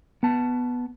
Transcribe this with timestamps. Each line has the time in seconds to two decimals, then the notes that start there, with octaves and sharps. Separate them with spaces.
0.23 B3 A5